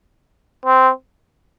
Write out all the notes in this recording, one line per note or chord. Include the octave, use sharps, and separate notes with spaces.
C4